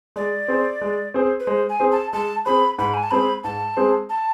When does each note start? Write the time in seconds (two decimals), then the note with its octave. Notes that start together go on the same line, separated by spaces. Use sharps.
0.16 G#3 D5
0.48 C4 G#4 C5
0.81 G#3
1.14 C4 G#4 C5
1.40 B4
1.47 G#3 C5
1.69 G#5
1.80 C4 G#4 C5
1.92 A5
2.13 G#3 A5
2.46 C4 G#4 C5 B5
2.78 G#2 B5
2.94 G#5
3.03 A5
3.11 G#3 C4 G#4 C5 B5
3.44 G#2 A5
3.77 G#3 C4 G#4 C5
4.10 A5